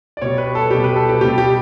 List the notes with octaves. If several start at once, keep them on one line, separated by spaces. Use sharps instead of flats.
D5
B2 G3 C#5
B4
A4
B2 G3 G4
B4
A4
G4
B2 G3 G4
G4